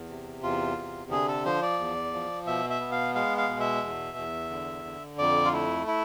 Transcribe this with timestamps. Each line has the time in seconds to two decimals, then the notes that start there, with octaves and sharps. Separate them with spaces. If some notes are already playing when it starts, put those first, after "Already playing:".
Already playing: E2
0.09 C3
0.43 E2 F4
0.77 C3
1.11 D3 G#4
1.28 A4
1.45 F3 C5
1.62 D5
1.79 E2
2.13 F3
2.46 B2 E5
2.70 E5
2.80 B3
2.92 F5
3.15 G#3 F5
3.38 F5
3.49 B2
3.60 E5
3.83 E2
4.17 E2
4.50 D3
4.85 D3
5.18 F2 D5
5.45 F4
5.53 A3 E4
5.87 E4